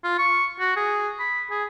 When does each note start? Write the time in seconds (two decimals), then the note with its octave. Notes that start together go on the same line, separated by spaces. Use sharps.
0.04 F4
0.19 C#6
0.60 F#4
0.77 G#4
1.19 B5
1.50 G#4